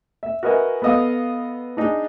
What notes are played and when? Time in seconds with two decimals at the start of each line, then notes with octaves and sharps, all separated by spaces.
0.23 E5
0.43 F#4 A#4 B4 D#5 E5 G#5
0.82 B3 A4 D#5 F5 D#6
1.77 D4 D#4 G#4